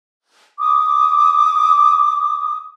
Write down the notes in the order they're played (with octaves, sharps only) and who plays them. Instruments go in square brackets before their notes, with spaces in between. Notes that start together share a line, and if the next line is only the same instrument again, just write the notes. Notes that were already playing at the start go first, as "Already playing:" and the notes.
[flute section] D6 D#6